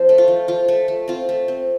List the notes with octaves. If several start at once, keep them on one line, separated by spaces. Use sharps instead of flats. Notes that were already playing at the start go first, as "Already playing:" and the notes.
Already playing: F3 C4 C5
A3
F4
F3
F3 F4
A3
A3
C4 F4
A3
C4